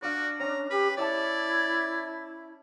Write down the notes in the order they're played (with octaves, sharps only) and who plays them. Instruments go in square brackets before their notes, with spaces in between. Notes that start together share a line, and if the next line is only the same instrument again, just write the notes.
[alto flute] D4 [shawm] F#4 [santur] D5 F5
[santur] C#4 [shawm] A#5
[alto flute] G4 [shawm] B4
[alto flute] E4 [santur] C#5 E5 A5 [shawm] D5